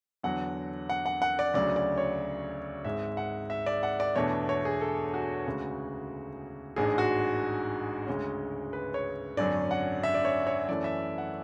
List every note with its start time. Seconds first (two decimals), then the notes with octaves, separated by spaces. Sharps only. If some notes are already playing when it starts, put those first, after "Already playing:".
0.23 E2 D3 F#3 F#5
0.89 F#5
1.06 F#5
1.22 F#5
1.39 D5
1.54 D2 C#3 F#3 D5
1.76 D5
1.98 C#5
2.85 G#1 G#2 G#3 E5
3.17 F#5
3.50 E5
3.66 D5
3.83 F#5
4.00 D5
4.16 E2 B2 A3 D4 C#5
4.49 C#5
4.65 G#4
4.81 A4
5.14 F#4
5.47 D2 C#3 G#3
6.76 A1 G#2 G#3 D4 G#4
6.98 F#4
8.07 D2 C#3 G#3 C#4
8.73 B4
8.94 C#5
9.37 G#1 F#2 D3 F#3 C#4 D5
9.71 F#5
10.03 E5
10.14 D5
10.25 C#5
10.47 C#5
10.68 F#2 E3 A3 C#4 D5
10.84 E5
11.18 F#5